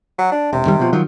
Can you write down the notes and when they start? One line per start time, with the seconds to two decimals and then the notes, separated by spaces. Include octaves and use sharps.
0.19 F#3
0.32 D4
0.53 E1 C3
0.65 F2 D#3 G3
0.80 B2 F3
0.93 D#3 F3 F#3